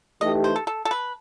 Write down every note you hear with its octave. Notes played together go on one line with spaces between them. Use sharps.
E3 A3 D#4 G4 D#5
C5
A4
A4
A4
B4